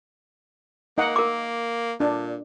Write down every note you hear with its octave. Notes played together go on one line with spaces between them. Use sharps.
A#3 D#4 D#5 F#5
A#4 D6
A#2 D4